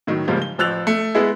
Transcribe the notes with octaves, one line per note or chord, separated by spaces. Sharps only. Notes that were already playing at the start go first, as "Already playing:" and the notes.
A2 D#3 F#3
G#2 C#3 F3 G3 A#3
G7
A1 F3 E6 F#6 A6 F7
A3
G#3 B3 E4 G#4